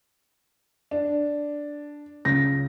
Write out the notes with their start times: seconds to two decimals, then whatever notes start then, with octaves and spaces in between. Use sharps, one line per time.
0.91 D4
2.25 C#2 A#6